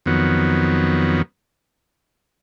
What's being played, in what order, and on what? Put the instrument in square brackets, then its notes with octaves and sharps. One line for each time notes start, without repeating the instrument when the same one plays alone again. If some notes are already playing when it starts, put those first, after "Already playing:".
[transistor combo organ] F2 D#3 F#3 B3